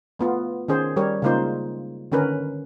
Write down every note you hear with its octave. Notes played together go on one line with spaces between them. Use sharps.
A3 B3 F4
D#3 C#4 G#4 C5
G3 G4 A#4 C#5
C#3 G#3 A#3 D#4 F4 C5
D3 D#3 C#4 A#4 B4